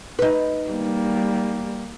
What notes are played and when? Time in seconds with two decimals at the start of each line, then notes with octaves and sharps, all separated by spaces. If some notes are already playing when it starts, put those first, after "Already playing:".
0.19 D#4 B4
0.71 G3 A#3